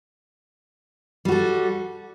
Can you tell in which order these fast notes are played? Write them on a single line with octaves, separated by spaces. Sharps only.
G3 F#4 A4